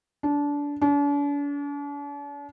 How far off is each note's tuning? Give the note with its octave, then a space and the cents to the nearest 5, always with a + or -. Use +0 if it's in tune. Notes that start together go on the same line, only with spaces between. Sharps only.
D4 -25
D4 -45